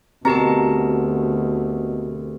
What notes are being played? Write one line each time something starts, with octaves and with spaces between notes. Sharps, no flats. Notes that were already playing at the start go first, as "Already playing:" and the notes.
D2 B2 C4 G4 A#4 A5 A#5